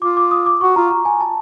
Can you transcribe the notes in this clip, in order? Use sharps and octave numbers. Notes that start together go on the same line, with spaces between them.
F4 D6
D6
D#6
D6
F#4 C#6
F4 A#5
A#5
G#5
A5